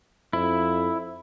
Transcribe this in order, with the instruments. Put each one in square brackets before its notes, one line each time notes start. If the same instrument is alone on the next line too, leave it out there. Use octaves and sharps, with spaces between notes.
[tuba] F2 [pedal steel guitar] E4